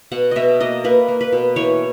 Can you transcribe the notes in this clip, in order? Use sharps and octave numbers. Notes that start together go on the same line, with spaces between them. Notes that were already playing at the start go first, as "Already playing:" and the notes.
B2 F#5
B2 D#5 E5
A#3 D#5
A#3 B4
A#3
B4
B2
E3 C#5